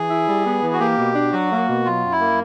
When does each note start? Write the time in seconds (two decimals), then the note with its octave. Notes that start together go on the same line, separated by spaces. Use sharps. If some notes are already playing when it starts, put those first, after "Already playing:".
Already playing: E3 G#4
0.10 E4
0.27 G3
0.45 B3
0.62 E3
0.73 F#4
0.80 A#3 G4
0.98 B2
1.14 D4
1.33 F#3 F#4
1.51 A#3
1.68 B2
1.85 F#3 F4
2.03 F#2
2.12 E4
2.20 A#3